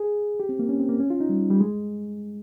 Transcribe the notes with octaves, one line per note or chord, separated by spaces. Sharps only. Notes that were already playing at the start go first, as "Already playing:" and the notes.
Already playing: G#4
G4
C4
A#3
C#4
C4
A#3
C#4
F4
D#4
G3
G3
G#3